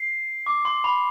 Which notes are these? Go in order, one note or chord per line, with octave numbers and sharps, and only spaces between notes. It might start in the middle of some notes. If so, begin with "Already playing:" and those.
Already playing: C7
D6
C6
B5